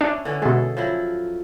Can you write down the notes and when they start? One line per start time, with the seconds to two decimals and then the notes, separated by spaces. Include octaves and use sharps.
0.01 C#4 D4 E4
0.25 D3 E3 C#4
0.42 B2 G#3 G#4 A4 E5
0.77 F3 F#3 E4